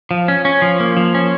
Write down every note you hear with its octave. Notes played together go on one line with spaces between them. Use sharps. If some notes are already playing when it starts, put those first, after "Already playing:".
F3
C#4
C#4
F3
A#3
F3
C#4